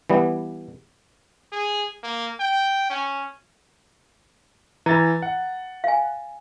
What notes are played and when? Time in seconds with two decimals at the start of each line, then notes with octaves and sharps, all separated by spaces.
0.10 E3 G3 B3
1.52 G#4
2.03 A#3
2.40 G5
2.90 C#4
4.86 E3 A#5 B5 A6
5.22 F#5
5.84 F5 G#5